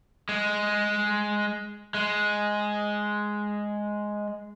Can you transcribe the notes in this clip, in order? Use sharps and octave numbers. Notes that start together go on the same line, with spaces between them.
G#3
G#3